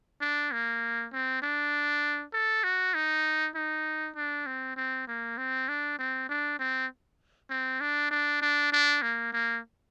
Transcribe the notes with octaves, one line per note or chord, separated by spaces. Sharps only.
D4
A#3
C4
D4
A4
F#4
D#4
D#4
D4
C4
C4
A#3
C4
D4
C4
D4
C4
C4
D4
D4
D4
D4
A#3
A#3